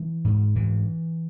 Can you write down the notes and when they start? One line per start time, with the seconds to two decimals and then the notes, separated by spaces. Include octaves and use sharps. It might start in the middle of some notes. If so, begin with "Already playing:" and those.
Already playing: E3
0.24 G#2
0.56 G#2 E3